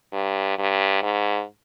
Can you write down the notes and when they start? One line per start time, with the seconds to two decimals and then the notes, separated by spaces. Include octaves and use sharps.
0.13 G2
0.58 G2
1.02 G#2